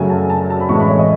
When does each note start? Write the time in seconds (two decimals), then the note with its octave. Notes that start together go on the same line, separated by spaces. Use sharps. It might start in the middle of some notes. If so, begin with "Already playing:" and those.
Already playing: F#2 C#3 F#3 A3 G#5
0.10 A5
0.30 A5
0.50 A5
0.60 B5
0.69 A1 A2 G#3 C#6
0.80 B5
0.89 C#5
0.99 D#5